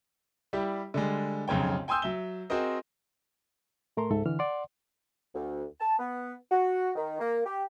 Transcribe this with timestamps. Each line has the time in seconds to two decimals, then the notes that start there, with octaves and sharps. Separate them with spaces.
0.53 G3 E4 G4
0.94 D3 G3 G#3
1.48 F1 B1 C#3 C#5 G5
1.88 G5 G#5 C6 D#6 E6 G6
2.02 F#3 E5 G7
2.50 C4 F#4 G#4 A#4 C5 D#5
3.97 A2 A3 A#4 A#5 C6
4.11 C#2 G#2 A4 E5
4.26 D3 E3 F6
4.39 D5 F#5 C6
5.34 D2
5.80 A5
5.99 B3
6.51 F#4
6.95 D#3
7.20 A#3
7.46 G4